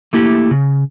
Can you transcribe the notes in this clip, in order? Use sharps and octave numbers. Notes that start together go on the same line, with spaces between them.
A3 A#3 E4 G4
C#3